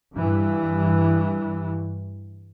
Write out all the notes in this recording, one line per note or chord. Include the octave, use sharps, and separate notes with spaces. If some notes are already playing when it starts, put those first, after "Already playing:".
G2 E3